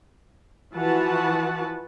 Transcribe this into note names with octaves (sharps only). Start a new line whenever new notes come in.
E3 F3 F#4 B4 F#5 A5